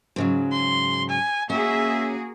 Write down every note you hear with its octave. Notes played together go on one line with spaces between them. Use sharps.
G#2 C#3 F#3
C6
G#5
A#3 C#4 F#4 G#4 E5